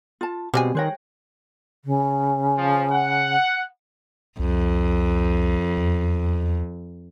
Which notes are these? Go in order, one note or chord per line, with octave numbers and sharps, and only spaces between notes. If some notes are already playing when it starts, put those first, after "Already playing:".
F4 A5
B2 G3 G#3 C4 G4 C5 G#5
D#3 C5 C#5 G5 C6 F#6 A#6
C#3
F3
F#5
C2 F2
E2